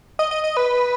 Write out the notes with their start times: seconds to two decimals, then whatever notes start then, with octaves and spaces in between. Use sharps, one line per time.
0.19 D#5
0.31 D#5
0.44 D#5
0.57 B4